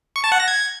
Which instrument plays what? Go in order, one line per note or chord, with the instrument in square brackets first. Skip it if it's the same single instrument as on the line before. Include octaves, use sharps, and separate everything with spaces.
[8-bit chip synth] C#6
A5
F#5
A#6
G#6